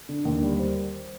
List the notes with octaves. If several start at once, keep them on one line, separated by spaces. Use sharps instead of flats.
D3
D#2
G3
C5